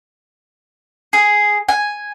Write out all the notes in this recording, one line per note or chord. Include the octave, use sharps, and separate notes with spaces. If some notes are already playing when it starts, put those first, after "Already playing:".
G#4
G#5